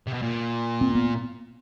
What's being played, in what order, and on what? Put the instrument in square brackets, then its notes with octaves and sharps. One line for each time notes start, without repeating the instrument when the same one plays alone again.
[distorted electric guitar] C3
B2
A#2
[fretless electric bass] C4
B3